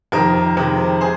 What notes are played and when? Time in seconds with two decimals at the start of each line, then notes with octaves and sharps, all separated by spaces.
0.12 F2 C3 D#3 A#4
0.57 F2 C3 D#3 G#3
1.01 G#4 C5